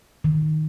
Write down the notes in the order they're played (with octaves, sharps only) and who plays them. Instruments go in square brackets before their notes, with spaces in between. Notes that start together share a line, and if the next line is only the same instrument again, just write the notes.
[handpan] D#3